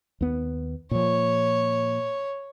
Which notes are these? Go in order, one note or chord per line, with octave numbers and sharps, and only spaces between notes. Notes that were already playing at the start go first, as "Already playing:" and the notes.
D#2 B3
A#2 F3 C#5